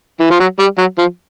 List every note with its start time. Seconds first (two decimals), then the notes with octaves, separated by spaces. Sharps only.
0.20 E3
0.30 F3
0.40 F#3
0.59 G3
0.78 F#3
0.98 F3